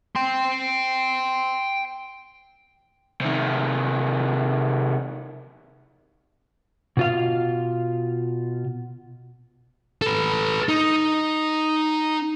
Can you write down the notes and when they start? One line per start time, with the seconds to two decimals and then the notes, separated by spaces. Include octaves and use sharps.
0.16 G5 C6
3.21 C3 D#3
6.97 B2 F4 F5
10.02 A4 B4
10.69 D#4